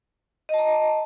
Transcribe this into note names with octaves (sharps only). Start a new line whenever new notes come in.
D#5 A5 A#5